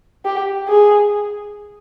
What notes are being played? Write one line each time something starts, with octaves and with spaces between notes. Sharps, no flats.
G4
G#4